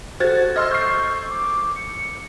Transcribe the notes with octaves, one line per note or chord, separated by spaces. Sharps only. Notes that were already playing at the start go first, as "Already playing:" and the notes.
F#4 A4 C5 F#5 G#6 A6
D#5 C6 E6 F6
C#6 G6 C7
D6
C#7